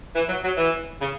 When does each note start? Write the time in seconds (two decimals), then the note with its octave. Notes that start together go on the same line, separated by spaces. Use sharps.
0.16 E3
0.29 F#3
0.44 F#3
0.58 E3
1.02 C#3